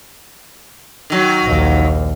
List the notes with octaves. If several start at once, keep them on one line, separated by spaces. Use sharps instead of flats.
D#3 F#3
A#1 D#2